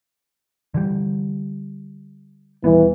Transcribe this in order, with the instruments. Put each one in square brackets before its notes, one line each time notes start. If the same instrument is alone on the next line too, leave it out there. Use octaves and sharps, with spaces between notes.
[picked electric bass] D3 E3 G3
[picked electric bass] D#1 G3 B3 [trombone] E3